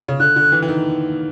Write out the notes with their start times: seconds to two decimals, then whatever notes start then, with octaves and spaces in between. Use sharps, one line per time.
0.08 C#3
0.20 D3 F#6
0.36 D3
0.52 E3
0.62 E3
0.68 D#3